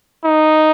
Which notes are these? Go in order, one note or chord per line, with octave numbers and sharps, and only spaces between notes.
D#4